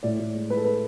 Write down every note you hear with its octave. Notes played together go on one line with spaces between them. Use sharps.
A2 D5
A2
G#3
G#3 B4
A4
G#3 B4